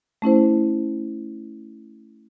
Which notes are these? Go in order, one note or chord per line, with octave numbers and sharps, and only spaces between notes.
A3 C#4 E4 C5